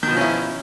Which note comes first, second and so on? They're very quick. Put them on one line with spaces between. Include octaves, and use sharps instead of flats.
D#3 B2 F3 C#4 E4